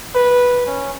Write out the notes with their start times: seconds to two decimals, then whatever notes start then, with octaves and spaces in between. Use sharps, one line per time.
0.15 B4
0.66 C#4